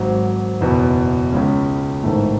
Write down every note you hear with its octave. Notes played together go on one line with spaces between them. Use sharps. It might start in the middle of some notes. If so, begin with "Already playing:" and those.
Already playing: G#1 G#2 F#3
F#1 E2 B2
C#2 C#3 G#3 C#4
A1 G#2 D#3 A3